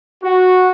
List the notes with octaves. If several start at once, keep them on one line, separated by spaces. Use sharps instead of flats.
F#4